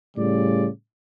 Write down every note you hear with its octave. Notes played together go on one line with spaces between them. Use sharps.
A2 C#3 G3 D5